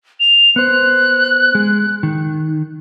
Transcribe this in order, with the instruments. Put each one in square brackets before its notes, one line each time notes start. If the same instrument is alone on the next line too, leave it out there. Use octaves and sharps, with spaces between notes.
[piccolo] F7
[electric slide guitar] B3 C5 [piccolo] F#6
[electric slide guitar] G#3
D#3